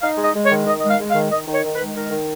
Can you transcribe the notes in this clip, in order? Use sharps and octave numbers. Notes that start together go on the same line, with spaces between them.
D#4 F5
G#3 D#5
G#3
C#5
D#3
D#3 D#5
D#5
G#3
F5
G#3
F5
D#3
D#3 D#5
D#3
C#5
D#3
B4
G#3
D#3 A#4
D#3